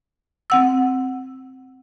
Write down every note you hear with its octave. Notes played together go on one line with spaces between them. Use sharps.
C4 F#5 E6